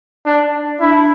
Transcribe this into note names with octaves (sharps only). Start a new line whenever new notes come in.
D4
D4 E4